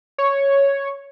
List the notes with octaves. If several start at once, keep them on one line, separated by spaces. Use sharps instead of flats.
C#5